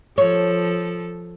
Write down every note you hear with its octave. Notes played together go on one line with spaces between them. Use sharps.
F3 A4 C#5